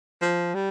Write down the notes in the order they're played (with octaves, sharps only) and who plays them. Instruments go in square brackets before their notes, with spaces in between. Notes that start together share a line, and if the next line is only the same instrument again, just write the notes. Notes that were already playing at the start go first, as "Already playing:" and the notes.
[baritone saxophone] F3
G3